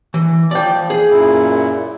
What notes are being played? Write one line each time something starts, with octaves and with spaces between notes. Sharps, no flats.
E3
F3 D5 G5
G#4
F#2 A#2 E4